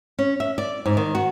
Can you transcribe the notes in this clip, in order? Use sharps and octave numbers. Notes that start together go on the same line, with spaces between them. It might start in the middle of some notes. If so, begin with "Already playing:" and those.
C#4
E5
D5
G#2
D#3
F#4